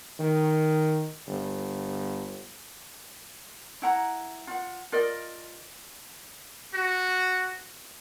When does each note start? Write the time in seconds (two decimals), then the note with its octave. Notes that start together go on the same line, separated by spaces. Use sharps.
0.19 D#3
1.28 G1
3.82 E4 F#5 A#5
4.47 F4 F#5
4.92 F4 A#4 D5 D#5
6.74 F#4